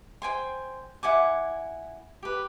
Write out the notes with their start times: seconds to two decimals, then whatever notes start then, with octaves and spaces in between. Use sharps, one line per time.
0.22 C5 G5 G#5 C6
1.03 E4 F#5 G#5 D6
2.23 G4 B4